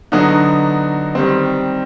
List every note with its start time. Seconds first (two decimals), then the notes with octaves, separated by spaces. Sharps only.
0.12 D3 F#3 B3 D#4 F#4
1.15 D#3 G3 C4